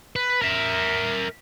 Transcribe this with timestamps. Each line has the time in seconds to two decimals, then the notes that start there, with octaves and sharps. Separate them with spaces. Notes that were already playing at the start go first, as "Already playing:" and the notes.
0.16 B4
0.42 A#4 E5